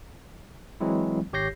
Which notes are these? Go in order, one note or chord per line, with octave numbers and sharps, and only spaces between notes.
E3 F#3 G#3 C4 E4
G#1 G4 C#5 G6 A#6 C7